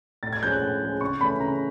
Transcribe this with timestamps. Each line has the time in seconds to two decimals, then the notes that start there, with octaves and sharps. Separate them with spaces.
0.23 A2 A6
0.33 G#6
0.42 F3 G#3 C#4 G6
0.52 F#6
0.62 A2
0.82 F3 G#3 C#4
1.01 C#3 C#6
1.21 E3 A3 C#4 B5
1.40 C#3 A#5